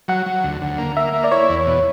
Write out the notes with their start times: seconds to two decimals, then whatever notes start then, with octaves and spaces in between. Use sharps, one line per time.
0.08 F#3 F#5
0.26 F#3
0.44 D2
0.61 D2
0.78 A#3
0.96 A#3 E5
1.13 A#3
1.24 D5
1.31 E4 C#5
1.49 E2
1.66 B2